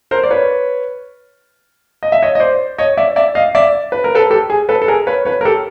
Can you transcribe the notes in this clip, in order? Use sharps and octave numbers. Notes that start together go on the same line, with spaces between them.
A#4 C5
D5
B4 C#5
D#5
E5
C#5 D#5
D#5
C5 D5
C#5 D#5
D5 E5
D5 E5
D#5 F5
D5 E5
B4
A#4
A4 B4
G4 A4
G#4
A4 B4
A4
G#4 A#4
B4 C#5
B4 C#5
A#4
G4 A4